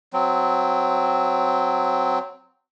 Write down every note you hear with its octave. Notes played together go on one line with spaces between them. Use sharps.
F#3 C4